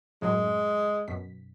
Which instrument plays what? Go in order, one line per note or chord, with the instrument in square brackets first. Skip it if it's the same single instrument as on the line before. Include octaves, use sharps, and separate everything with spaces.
[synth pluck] F#2 A2 F#3 [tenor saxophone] G#3
[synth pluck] F#2 B2 B6